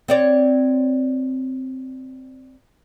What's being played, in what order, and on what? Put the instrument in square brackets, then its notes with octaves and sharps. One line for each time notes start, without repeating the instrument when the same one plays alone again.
[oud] C4 C#5 D5